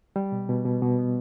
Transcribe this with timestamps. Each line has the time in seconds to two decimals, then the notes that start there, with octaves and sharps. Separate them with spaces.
0.16 G3
0.32 B2
0.49 B2
0.65 B2
0.82 B2
0.99 B3